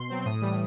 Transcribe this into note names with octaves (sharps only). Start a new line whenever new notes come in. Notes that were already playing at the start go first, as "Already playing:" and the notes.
Already playing: B2 C6
F#3 C4
C6
A2 D#6
E3 G3